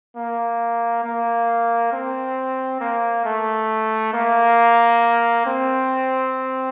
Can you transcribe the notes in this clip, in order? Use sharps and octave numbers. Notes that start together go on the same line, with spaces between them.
A#3
A#3
C4
A#3
A3
A#3
C4